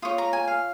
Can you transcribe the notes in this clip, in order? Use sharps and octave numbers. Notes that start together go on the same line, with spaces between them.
F4 C#5 D#6
A#5
G#5
F5